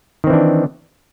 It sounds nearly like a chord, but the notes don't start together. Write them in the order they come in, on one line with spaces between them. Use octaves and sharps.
D#3 C4 E3 D4